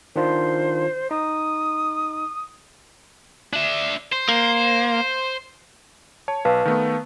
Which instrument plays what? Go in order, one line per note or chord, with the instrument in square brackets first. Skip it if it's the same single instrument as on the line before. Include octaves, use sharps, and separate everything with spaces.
[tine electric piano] D#3 D4 F4 [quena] C5
[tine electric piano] D#4 [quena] D#6
[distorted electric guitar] D4 E5
C5
[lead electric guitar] A#3
[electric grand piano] C#5 [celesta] A5
[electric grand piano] B1 [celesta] B4 F5 A5
[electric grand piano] D#3 A3 B3